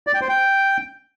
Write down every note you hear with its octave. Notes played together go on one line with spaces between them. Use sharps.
D5
G5
C5
G5